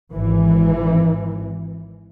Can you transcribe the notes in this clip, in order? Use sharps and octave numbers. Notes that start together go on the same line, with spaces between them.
G#1 E3